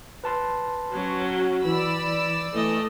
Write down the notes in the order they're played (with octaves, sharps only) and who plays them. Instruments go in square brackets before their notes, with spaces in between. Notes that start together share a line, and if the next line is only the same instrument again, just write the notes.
[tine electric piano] B4 A5 C6
[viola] F#3 C#4 [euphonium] F#4
[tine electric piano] E3 [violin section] D5 E6 [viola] B5
[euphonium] E3 [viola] A3 D#5